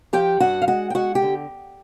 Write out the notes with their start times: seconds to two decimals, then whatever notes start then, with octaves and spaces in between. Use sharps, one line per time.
0.13 F3 G4 G5
0.40 G2 F#4 F#5
0.62 F5
0.67 G#3 F#4 F#5
0.90 G5
0.95 G#3 F#4 F#5
1.15 G4 G5
1.22 D3